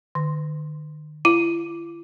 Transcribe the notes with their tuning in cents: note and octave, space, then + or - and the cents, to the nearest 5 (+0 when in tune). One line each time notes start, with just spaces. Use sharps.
D#3 -45
E4 +45